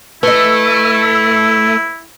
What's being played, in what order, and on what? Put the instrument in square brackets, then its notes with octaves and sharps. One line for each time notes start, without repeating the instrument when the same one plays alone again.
[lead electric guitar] A3 [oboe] E4 [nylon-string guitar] B4 D#5